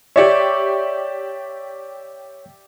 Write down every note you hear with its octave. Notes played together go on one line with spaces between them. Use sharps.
G4 C#5 D5 E5 C#6